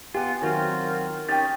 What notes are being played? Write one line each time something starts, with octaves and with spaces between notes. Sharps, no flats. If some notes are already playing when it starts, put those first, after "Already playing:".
B3 F4 G4 G#5
D#3 F#3 C4 F4 F#4 A#4
C#4 D#4 G4 G5 A6